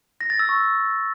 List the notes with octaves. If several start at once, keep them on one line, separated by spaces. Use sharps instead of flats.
A#6
A6
E6
C#6